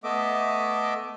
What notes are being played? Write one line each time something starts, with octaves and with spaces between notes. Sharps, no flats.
A3 B3 D#5 E5 D6